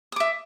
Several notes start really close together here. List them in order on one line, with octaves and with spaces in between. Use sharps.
D#6 D6 E5